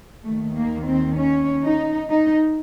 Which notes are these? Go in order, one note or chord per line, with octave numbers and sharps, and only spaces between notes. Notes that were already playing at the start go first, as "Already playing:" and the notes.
D#2 D#3 A3
A#3
C4
C#4
D#4
D#4